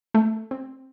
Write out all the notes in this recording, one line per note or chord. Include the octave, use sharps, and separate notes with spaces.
A3
C4